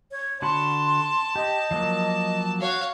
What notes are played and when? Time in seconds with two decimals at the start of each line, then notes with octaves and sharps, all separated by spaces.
0.11 C#5
0.42 D3 F#4 A5 B5 C6
1.36 G4 D#5
1.71 F3 F#3 A#3
2.60 F#4 C#5 F5